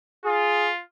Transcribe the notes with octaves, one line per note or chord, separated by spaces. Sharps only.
F4 G#4